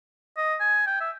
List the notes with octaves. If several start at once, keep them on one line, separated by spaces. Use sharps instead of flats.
D#5
G#5
G5
E5